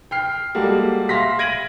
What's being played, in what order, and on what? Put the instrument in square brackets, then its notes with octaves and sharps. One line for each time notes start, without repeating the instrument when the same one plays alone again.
[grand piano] G5 F6 C7
G3 G#3 A#3 F#4 A4
E5 F5 C6 A#6 B6
G#6 A#6 D7 D#7 F#7